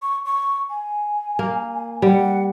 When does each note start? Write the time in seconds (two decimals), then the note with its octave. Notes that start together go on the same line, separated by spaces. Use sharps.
0.02 C#6
0.26 C#6
0.70 G#5
1.39 A#3
2.02 G3 F#5